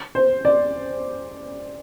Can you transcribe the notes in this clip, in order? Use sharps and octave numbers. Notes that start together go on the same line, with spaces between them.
C5
D5